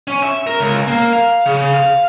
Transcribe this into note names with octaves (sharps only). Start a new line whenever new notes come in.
C#4
E5
A#4
C#2
A#3
F5
C#3
F5